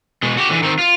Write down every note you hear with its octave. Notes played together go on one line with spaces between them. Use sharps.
B2 G#3
F#4 G4
D3 E3
D#3 C4
F4